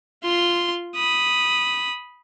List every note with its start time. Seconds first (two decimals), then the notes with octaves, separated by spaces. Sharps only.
0.23 F4 C6
0.96 B5 D#6